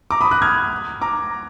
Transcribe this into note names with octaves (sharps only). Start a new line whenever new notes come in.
A#5 D6
B5 D#6
D#6 F#6
F6 G#6
A#5 D6